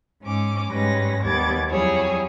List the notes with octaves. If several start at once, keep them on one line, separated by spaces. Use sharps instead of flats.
G#2 C#4 D6
G#2 G3 G#3 C#4 B4 A#6
D#2 G3 B3 D6 G#6 A6
F2 F#3 G3 E4 G#4 C#5